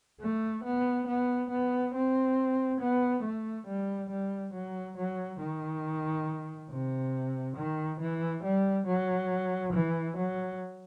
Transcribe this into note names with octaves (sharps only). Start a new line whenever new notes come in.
A3
B3
B3
B3
C4
B3
A3
G3
G3
F#3
F#3
D#3
C3
D#3
E3
G3
F#3
E3
F#3